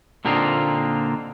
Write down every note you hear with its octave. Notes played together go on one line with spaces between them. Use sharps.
A#2 D3 A#3 C4 D#4 F4